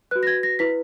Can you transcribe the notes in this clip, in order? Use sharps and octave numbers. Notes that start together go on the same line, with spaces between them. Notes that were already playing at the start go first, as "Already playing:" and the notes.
F#4 B4 F#6
A#6
G#6
A#6
E4 B4 B6